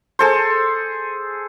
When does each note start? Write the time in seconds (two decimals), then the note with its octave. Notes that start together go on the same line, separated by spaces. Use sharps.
0.19 G#4 A4 C5